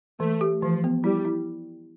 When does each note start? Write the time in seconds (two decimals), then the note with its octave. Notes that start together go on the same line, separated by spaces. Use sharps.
0.20 E3 A3
0.41 G4
0.62 E3 F3
0.84 B3
1.04 G3 E4
1.25 E4